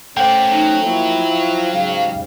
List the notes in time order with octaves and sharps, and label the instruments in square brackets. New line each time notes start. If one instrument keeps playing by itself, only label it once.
[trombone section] A3 C#4 [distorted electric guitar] A#3 D5 [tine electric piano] C5 F#5 G5
[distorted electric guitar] F#3 [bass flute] D#4
[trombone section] F3 E4 [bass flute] A#3
[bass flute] F5
[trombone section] G#2 C#3 G3